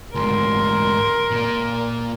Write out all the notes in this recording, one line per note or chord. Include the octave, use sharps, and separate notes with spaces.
D2 G#2 A#4 C6
A#2 A#3